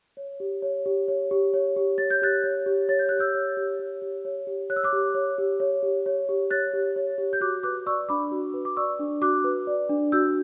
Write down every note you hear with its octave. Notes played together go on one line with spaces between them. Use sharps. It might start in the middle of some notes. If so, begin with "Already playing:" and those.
C#5
G4
C#5
G4
C#5
G4
C#5
G4
C#5 A6
G6
G4 F#6 A6
C#5
G4
C#5 A6
G6
G4 F#6
E6 G6
C#5
G4
C#5
G4
C#5
G4
C#5 F#6
E6
D6 F#6
G4
C#5
G4
C#5
G4
C#5
G4
C#5 F#6 A6
G4
C#5
G4
G6
F#4 D6 F#6
B4 D6 F#6
D5 C#6 E6
D4 B5 D6
F#4
B4
D6
D5 C#6 E6
D4
F#4 D6 F#6
B4
D5
D4
F#4 E6 G6